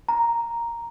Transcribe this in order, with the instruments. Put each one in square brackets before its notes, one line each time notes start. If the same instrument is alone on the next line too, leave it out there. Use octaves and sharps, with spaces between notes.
[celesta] A#5